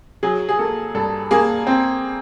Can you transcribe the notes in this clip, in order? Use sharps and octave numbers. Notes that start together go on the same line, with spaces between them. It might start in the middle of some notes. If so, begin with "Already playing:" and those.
F#3 G#4
G#4
A#3 A4
G2 A4
A#3 G#4
C4